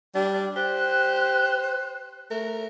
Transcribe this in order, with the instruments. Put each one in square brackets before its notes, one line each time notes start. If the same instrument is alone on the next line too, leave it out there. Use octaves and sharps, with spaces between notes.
[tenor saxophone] G3 [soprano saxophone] D4
[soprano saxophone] G4 [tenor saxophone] C5 [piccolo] F#6
[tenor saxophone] A3 [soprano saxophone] A#4